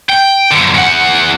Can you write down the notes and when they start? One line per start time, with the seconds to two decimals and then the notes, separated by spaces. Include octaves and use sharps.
0.09 G5
0.51 F#2 D3
0.74 E2 F#5